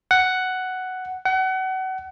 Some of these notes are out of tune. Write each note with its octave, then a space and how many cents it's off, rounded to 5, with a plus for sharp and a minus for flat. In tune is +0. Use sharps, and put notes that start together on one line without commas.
F#5 +5
F#5 +30